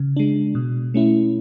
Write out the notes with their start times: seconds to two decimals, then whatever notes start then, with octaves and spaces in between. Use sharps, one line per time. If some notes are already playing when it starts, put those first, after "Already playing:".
Already playing: C#3
0.16 G#3 D4
0.55 B2
0.94 A3 C#4 E4